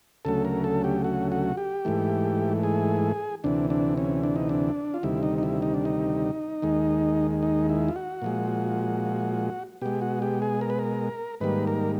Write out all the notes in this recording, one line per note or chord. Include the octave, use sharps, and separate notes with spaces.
D2 C#3 F#3 A3 A4
A#4
A4
G4
F#4
F#4
G4
G#2 E3 A3
G#4
D2 C3 E3 D4
D4
C#4
D4
D#4
D4
F4
D2 C3 D#3 G3 E4
D#4
D#4
E4
D#4
D4
D#4
D#2 D#3 G#3
D#4
E4
F4
F#4
A#2 F3 G#3
B2 G#3 G4
F#4
G4
G#4
A#4
B4
A#4
G#2 D#3 G3 A#3 B4
A#4